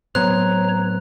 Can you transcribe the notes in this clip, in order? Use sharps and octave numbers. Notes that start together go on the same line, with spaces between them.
A2 F#3 B3 C5 C#5 A#5 F#6